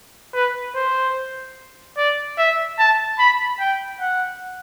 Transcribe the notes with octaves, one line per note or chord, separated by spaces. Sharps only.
B4
C5
D5
E5
A5
B5
G5
F#5